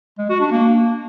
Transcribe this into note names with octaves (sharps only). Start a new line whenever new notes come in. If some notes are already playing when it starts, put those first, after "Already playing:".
G#3
F#4
D4
A#3